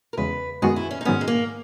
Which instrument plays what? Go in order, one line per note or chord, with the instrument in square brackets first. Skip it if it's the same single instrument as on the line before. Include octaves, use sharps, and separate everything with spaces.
[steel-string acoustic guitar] A#4
[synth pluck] E2 C#3 G#3 [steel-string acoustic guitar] B4
[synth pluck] F#2 D#3 G#3 B3 F#4 [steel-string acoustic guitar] G#4
[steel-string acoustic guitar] E4
C#4
D#4
[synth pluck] G#2 D#3 F#3 B3 [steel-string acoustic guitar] C#4
[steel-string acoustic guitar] G#3
A#3